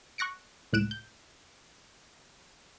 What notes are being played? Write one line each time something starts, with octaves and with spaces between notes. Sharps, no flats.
C#6 F#6 A#6 C#7 D7
C#2 A2 F#6 D7 E7
G6